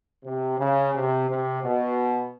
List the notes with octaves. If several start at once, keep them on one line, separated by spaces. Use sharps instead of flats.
C3
C#3
C3
C3
B2